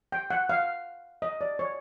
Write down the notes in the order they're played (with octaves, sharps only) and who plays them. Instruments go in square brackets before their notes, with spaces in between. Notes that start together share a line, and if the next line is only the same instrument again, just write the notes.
[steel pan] G5
F#5
F5
D#5
D5
C#5